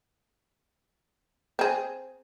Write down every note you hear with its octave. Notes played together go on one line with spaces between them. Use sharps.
C4 G#4